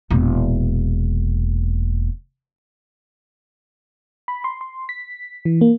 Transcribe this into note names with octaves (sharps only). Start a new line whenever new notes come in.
E1 A#2
B5
C6
C6
B6
E3
A#3